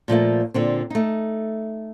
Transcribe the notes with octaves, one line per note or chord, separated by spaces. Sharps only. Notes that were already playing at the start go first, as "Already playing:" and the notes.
A#2 F3 A3 A#3
A#2 D3 C4
A3 D#4